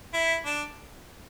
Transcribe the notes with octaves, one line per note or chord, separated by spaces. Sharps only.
E4
D4